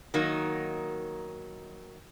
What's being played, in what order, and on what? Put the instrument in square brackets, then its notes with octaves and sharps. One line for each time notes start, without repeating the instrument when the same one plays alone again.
[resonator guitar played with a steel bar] D#3 F#3 A#3 D#4